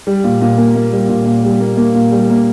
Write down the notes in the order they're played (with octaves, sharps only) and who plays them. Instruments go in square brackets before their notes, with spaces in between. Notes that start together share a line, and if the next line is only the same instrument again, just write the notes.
[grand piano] G3
A#2
A#2
A#3
A#3
G3
A#2
A#2
G3
A#3
A#3
A#2
G3
A#3